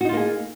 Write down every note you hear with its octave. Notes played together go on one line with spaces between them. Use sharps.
A#3 D#4 F4 F#4 G#4